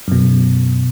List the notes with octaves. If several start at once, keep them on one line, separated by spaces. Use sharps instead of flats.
F#2 B2